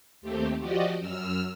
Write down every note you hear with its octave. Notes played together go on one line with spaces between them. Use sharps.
D#2 A3 C4 G4
F3 F#4 G4 D5 D#5
F#2 E6 F6